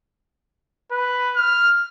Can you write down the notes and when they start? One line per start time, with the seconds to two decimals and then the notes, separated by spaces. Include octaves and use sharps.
0.91 B4
1.36 F6